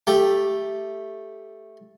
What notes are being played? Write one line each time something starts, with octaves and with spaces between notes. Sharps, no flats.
A3 G4